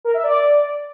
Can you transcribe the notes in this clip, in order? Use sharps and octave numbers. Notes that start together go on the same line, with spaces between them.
A#4
E5
D5